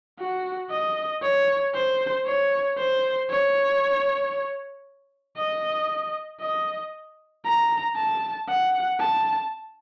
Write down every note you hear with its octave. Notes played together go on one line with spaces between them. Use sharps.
F#4
D#5
C#5
C5
C#5
C5
C#5
D#5
D#5
A#5
A5
F#5
A5